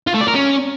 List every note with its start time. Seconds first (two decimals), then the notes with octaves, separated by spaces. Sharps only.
0.07 F4
0.14 A3
0.21 D5
0.28 A#4
0.35 C#4